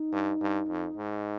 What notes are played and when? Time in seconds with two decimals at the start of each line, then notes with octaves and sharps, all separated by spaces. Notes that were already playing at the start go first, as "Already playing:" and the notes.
Already playing: D#4
0.12 G2
0.41 G2
0.68 F2
0.96 G#2